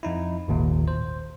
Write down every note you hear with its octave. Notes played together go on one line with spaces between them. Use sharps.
F2 D#4 E4
G#1 D#2 A#2
C5